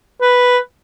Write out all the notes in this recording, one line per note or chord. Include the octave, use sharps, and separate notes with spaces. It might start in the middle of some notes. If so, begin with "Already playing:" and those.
B4